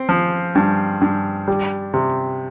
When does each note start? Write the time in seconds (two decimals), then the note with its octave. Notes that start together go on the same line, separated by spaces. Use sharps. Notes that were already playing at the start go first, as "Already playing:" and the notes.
Already playing: C4
0.09 F3
0.55 G2
1.01 G2
1.48 G3
1.94 C3